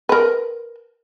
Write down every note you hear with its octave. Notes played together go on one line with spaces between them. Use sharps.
A#4 B4